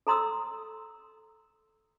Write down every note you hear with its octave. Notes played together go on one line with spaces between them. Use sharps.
A4 A#5 C6 D#6 E6